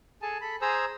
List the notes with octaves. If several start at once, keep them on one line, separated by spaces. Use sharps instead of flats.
G#4 A4 G#5 A5
A4 B5
G#4 C5 G#5 A#5 D#6 E6